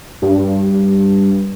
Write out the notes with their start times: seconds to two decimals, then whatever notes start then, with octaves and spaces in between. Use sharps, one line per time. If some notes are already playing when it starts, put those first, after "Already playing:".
0.22 G2